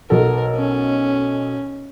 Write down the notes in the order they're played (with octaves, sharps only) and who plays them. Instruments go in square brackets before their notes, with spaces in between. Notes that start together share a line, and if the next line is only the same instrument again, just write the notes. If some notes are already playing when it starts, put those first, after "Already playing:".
[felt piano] B1 F#3 A4 [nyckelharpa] A#4
[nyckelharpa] C#4